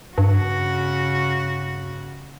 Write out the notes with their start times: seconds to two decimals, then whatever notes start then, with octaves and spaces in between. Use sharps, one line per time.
0.18 G2 C#3 F#4